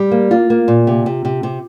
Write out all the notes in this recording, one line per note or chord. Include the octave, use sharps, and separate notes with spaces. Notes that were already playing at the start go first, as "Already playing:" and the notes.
Already playing: G3
A#3
A#3 F4
A#3
A#2
C3
C3
C3
C3